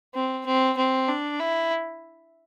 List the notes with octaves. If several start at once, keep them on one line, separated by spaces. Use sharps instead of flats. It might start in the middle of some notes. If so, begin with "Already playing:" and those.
C4
C4
C4
D4
E4